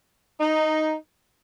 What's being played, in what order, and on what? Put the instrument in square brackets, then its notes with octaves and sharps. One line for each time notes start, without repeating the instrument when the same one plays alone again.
[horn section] D#4